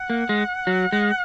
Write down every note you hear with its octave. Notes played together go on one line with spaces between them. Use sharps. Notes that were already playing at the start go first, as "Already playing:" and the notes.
Already playing: F#5
A#3
G#3
F#3
G#3